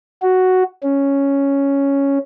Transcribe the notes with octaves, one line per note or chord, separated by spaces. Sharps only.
F#4
C#4